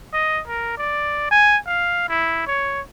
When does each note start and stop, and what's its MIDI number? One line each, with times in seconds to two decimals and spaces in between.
0.14 0.41 75
0.48 0.74 70
0.77 1.26 74
1.31 1.57 80
1.67 2.06 77
2.09 2.46 64
2.47 2.81 73